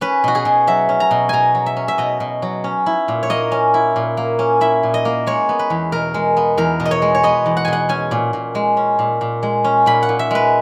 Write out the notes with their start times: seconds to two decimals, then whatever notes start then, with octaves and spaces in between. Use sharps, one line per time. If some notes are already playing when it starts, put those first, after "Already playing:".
0.01 C#4 B4
0.24 B2 F#4
0.35 G#4
0.45 B2
0.67 F#3 E5
0.89 C#4
1.00 A#5
1.11 B2
1.29 B2 G#5 A#5
1.55 F#3
1.66 E5
1.77 C#4
1.88 E5
1.98 B2 D#5
2.20 B2
2.42 F#3
2.64 C#4
2.86 E4
3.08 A#2
3.23 C#5
3.30 A#3 D#5
3.52 C#4
3.74 E4
3.96 A#2
4.17 A#3
4.39 C#4
4.61 E4 E5
4.83 A#2
4.94 D#5
5.05 A#3
5.27 G#3 C#5
5.49 B3
5.59 B4
5.70 E2
5.92 B2 A#4
6.14 G#3
6.37 B3
6.58 E2 A#4
6.80 B2
6.85 D#5
6.91 C#5
7.02 G#3
7.15 C#5
7.23 B3 D#5
7.46 E2
7.57 F#5
7.65 B2 G#5
7.73 F#5
7.89 C#4 G#5
8.11 A#2
8.33 A#2
8.55 G#3
8.77 C#4
8.99 A#2
9.21 A#2
9.43 G#3
9.64 C#4
9.86 A#2 B5
10.03 F#5
10.09 A#2
10.19 E5
10.31 G#3 B4